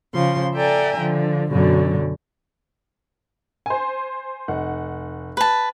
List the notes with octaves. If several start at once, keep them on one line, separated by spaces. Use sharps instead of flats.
C#3 F3 C6
A4 D5 E5 G5 G#5 A#5
D3 F3
F#2 B2 D3 F#3
C5 G#5
F1 F#5
B4 A5